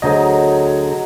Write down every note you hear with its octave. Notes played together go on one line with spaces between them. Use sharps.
D2 D3 F#3 D#4 G#4 C5 D#5